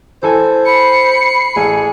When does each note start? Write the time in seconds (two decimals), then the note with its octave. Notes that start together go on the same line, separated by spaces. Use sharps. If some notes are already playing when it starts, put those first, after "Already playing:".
0.23 E3 A4 C5 G#5
0.66 B5 C7 C#7
1.56 A1 G#4